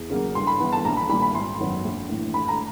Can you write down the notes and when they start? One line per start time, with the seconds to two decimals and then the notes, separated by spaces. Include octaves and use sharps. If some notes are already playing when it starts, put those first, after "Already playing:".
Already playing: E2
0.10 C#3 F#3 A#3
0.35 G2 C6
0.47 B5
0.60 E3 G3 B3
0.73 A5
0.85 A#1 A#5
0.97 B5
1.09 G3 B5
1.14 A#2
1.22 B5
1.34 G#1 C6
1.60 F#2 D#3 F#3 B3
1.84 A#1
2.09 A2 E3
2.34 A1 B5
2.48 A#5